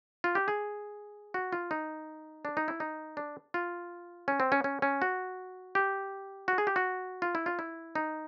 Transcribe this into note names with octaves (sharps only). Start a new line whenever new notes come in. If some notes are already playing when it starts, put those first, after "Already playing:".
F4
G4
G#4
F#4
F4
D#4
D4
D#4
E4
D#4
D4
F4
C#4
C4
C#4
C#4
C#4
F#4
G4
F#4
G#4
G4
F#4
F4
E4
F4
E4
D#4